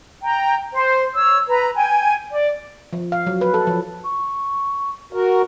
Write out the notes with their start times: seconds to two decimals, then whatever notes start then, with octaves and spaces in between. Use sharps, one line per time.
0.23 G5 A#5
0.73 C5
1.15 C#5 E6
1.48 B4 A#5
1.76 G5 G#5
2.32 D5
2.93 F3
3.12 F5
3.26 F#3
3.41 B4
3.54 A4
3.67 F3
4.04 C#6
5.13 F#4 A#4